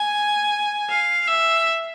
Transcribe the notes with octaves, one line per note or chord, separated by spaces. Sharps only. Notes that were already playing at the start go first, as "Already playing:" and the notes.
Already playing: G#5
F5
E5